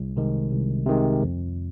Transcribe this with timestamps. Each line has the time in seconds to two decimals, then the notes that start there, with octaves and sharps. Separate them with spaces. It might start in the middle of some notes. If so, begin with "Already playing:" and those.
Already playing: C2
0.16 C3 D#3 G#3
0.52 C2
0.86 C3 D#3 G#3
1.22 F2